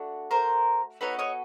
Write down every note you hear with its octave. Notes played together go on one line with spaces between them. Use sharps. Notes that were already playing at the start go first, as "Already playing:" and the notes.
Already playing: A3 D4 F#4
A#4 C5
B3 D#4 F#4 A4 B4 C#5
C#5 D#5